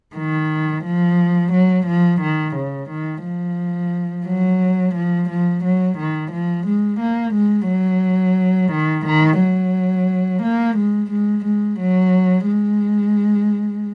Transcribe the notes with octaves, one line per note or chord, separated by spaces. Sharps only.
D#3
F3
F#3
F3
D#3
C#3
D#3
F3
F#3
F3
F3
F#3
D#3
F3
G#3
A#3
G#3
F#3
D#3
D#3
F#3
A#3
G#3
G#3
G#3
F#3
G#3